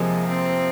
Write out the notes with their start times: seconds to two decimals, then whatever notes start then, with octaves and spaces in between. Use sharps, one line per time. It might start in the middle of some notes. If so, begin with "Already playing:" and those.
Already playing: F2 C3 F3 G#3 A#3
0.28 C4